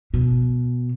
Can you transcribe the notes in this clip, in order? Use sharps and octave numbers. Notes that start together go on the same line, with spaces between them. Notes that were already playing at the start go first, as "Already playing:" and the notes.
B2